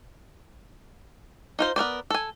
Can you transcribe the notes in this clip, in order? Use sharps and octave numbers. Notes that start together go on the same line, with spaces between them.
D#4 F4 C5
B3 A#4 C5 D5
A4 G#5